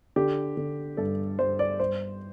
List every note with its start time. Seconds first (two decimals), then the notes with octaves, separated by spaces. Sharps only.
0.16 D3 G4
0.57 D3
0.97 G2 A4
1.39 G2 C5
1.59 D5
1.80 G2 C5